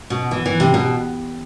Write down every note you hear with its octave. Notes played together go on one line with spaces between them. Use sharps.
B2
E3
E3
C3
B2